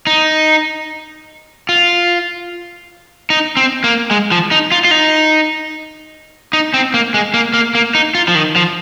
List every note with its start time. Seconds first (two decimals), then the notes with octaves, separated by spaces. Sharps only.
0.07 D#4
1.69 F4
3.30 D#4
3.57 C4
3.84 A#3
4.11 G#3
4.32 F3
4.51 D#4
4.72 F4
4.85 F4
4.91 D#4
6.53 D#4
6.74 C4
6.94 A#3
7.14 G#3
7.34 A#3
7.54 A#3
7.75 A#3
7.95 D#4
8.15 F4
8.28 F3
8.35 D#3
8.56 F3